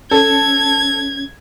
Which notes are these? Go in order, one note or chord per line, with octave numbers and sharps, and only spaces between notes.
C#4 A4 G#6